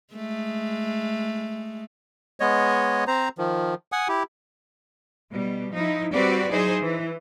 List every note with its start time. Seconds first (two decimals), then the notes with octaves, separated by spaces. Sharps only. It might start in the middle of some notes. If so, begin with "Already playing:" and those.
0.14 G#3 A3
2.40 G#3 B3 C#5 D#5
3.07 C4 C5 A#5
3.38 D#3 F3
3.92 F#5 G#5 D#6
4.08 E4 G4
5.32 B2 G3
5.73 F3 D#4 E4
6.14 G3 C4 F#4 G4 B4 D5
6.50 F#3 D#4 E4 G#4 C5
6.81 E3